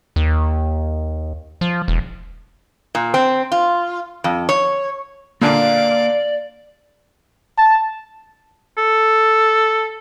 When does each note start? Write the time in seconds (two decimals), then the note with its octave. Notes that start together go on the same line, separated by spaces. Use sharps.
0.16 D#2
1.61 F3
1.88 E1
2.95 A#2
3.14 C4
3.52 F4
4.24 F2
4.49 C#5
5.42 A#2 D3 A#3 D5 F5 G#5 A#5 D6
7.58 A5
8.78 A4